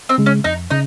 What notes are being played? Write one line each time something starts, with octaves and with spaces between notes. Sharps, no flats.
C4
C#3 G#3
C#4
F2 D#4
C#3 D#4